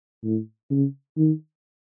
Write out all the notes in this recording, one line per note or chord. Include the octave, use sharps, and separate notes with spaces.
A2
C#3
D#3